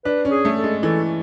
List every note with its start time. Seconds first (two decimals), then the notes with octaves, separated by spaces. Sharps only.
0.05 D4 B4
0.25 C#4
0.31 G#4
0.45 A3
0.58 A4
0.64 G#3
0.83 E3 A4